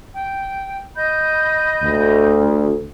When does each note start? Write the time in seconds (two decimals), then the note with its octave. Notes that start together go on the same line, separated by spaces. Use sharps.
0.13 G5
0.95 D#5 B5 G6
1.82 D2